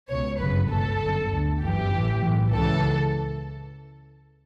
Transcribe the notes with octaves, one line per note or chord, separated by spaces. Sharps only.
C#2 B2 C#5
G1 F#2 C#3 B4
C#2 B2 A4
G1 F#2 D3
D2 D3
G1 F#2 E3 G4
A1 A2 E3
B1 A2 E3
C#2 C#3 E3 A4